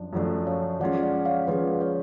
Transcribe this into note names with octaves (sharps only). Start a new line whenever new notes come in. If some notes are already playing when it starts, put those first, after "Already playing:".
Already playing: F#2 F3 D4
F#2 F3 A3 D4
C#5 F5
F3 G#3 C#4 F4 D5 F#5
D5 F#5
C#5 F5
F3 G#3 C#4 F4 B4 D5
C#5 F5